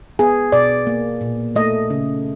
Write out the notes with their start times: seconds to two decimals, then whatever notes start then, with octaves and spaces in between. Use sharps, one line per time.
0.19 B3 G#4
0.52 B2 D5
0.87 A#3
1.21 A#2
1.56 A3 D#5
1.90 C#3